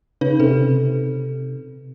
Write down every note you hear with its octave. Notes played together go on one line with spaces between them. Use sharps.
C#3 D#4 B4
C3 A4